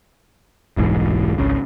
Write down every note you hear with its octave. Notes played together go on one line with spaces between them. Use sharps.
D#1 B1 G#2 E3
G#1 C#2 C#3